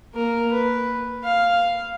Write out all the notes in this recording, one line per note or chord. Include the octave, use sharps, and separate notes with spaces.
A#3 A#4
B4
F5